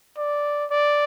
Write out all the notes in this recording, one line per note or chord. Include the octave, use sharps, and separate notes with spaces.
D5
D5